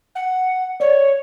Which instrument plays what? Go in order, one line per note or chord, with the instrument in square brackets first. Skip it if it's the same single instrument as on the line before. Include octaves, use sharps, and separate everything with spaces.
[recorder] F#5
[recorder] C#5 [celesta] D5